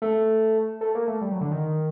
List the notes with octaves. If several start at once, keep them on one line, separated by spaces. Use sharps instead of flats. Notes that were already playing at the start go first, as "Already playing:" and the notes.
A3
A3
A#3
A3
G3
F#3
D3
D#3